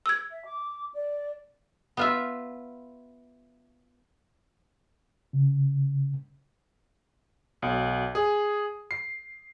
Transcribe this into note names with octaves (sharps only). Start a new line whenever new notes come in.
E6 G#6
E5
D6
D5
B3 F4 E5
C#3
B1
G#4
C7